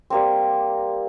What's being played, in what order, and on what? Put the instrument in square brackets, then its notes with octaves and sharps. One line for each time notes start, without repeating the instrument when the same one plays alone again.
[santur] G3 A#3 C4